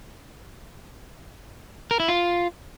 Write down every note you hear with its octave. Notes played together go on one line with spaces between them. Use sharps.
A#4
E4
F4